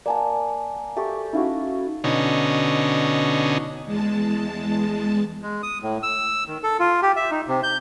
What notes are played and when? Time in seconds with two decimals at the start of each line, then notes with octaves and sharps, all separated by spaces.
0.06 A#3 D5 F#5 G#5 A5
0.96 G4 A4 E5 C#6 D6
1.33 C#4 D#4 E4 F#4 F5
2.04 B2 D3 C#4 D#4
3.85 E2 G#3 A5
5.42 G#3
5.63 D#6
5.83 A2
6.03 E6
6.47 D#3
6.63 A4
6.80 F4
7.02 G4
7.16 E5
7.31 D#4
7.47 C3
7.63 G6